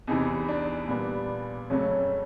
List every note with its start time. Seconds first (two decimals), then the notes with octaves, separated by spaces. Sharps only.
0.07 E2 C3 E3 D#4
0.49 D4
0.88 A#2 G3 B3
1.70 F2 C#3 F#3 A3 C#4